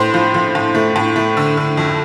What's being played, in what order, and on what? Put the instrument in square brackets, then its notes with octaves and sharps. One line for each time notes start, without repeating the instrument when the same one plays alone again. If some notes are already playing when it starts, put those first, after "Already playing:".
Already playing: [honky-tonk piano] A2 C5
F3
F3
A2
A3
A2
A3
D3
D3
F2